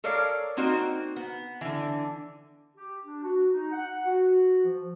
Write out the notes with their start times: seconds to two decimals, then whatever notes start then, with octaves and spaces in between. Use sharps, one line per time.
0.04 A4 A#4 C#5 D5 F5 A#5
0.57 A#3 C4 D#4 F#4
1.16 B3
1.61 D3 E3
2.76 G4
3.05 D4
3.24 F#4
3.52 D#4
3.72 F#5
4.06 F#4
4.63 F3